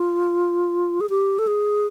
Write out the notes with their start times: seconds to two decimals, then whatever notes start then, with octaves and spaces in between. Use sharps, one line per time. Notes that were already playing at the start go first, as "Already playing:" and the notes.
Already playing: F4
1.01 G#4
1.10 G4
1.39 A4
1.47 G#4